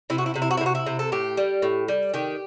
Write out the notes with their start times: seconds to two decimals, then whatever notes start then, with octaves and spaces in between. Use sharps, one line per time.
0.10 C3 E4
0.18 F#4
0.26 E4
0.34 C3 F#4
0.42 E4
0.51 F#4
0.57 E4
0.61 C3
0.66 F#4
0.75 E4
0.86 C3
0.99 A4
1.12 A2 G4
1.37 G3
1.62 A2
1.88 G3
2.14 D#3 G4